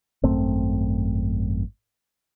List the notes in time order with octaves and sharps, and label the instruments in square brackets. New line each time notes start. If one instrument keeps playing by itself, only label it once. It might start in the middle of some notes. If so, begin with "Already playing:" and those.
[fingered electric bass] G#1 F#2 A3 C4